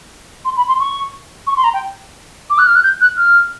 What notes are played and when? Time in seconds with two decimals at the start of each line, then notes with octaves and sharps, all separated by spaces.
0.45 C6
0.57 B5
0.68 C6
0.80 C#6
1.47 C#6
1.57 C6
1.64 A#5
1.74 G5
2.50 D6
2.59 F#6
2.67 F6
2.75 F#6
2.83 G6
3.01 F#6
3.17 F6